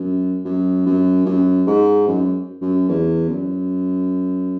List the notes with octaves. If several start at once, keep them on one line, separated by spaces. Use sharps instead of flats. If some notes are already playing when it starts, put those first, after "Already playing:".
Already playing: F#2
F#2
F#2
F#2
G#2
F#2
F#2
E2
F#2